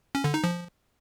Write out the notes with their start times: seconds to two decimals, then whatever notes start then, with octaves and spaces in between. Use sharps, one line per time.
0.15 C#4
0.24 D3
0.34 D#4
0.44 F3